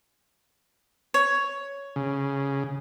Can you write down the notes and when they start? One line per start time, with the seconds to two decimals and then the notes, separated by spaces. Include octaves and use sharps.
1.14 C#5
1.96 C#3